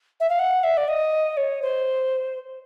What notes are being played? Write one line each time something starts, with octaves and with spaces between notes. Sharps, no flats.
E5
F5
F#5
E5
D5
D#5
C#5
C5